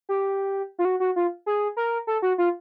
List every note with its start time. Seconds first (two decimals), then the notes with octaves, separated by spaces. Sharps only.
0.09 G4
0.79 F4
0.85 F#4
1.00 F#4
1.16 F4
1.46 G#4
1.77 A#4
2.07 A4
2.22 F#4
2.38 F4